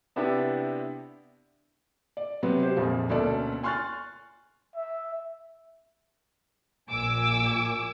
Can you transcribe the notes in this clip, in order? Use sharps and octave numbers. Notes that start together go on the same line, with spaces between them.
C3 B3 D4 E4 G4
D5
C3 F#3 B3 C4
G4 C5
A#1 F2 A#2 F3 G#3
D2 B2 A#3 C#4 A4 D5
G#5 C6 C#6 F6 F#6 A6
E5
A#1 A#2 A#3 G#5 D6 E6